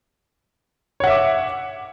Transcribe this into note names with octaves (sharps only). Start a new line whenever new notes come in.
C#5 E5 F#5 D6